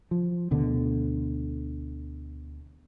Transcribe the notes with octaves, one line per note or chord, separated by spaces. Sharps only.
F3
D2 B2 D3